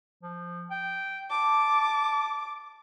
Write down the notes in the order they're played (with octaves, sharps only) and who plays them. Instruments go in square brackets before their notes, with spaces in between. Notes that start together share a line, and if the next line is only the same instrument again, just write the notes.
[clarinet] F3
G5
[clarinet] A5 [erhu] D6